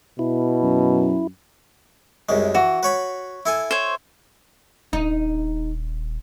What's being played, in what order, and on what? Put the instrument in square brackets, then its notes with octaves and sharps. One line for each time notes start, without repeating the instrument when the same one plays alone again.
[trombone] B2 [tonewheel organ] E4
[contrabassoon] F#2
[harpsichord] C2 F#2 G#3
[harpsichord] E3 [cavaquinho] F#4
[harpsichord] B4 C#5 B5
E4 A4 G#5
[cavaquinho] C5 C#5
[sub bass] D#1 [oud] D#4